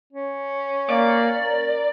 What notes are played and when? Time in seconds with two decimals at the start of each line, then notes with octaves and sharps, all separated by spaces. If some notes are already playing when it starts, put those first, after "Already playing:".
0.13 C#4
0.90 A#3 D5
1.44 A#4